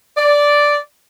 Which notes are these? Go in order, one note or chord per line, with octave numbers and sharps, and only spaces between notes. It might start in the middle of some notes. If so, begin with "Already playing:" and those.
D5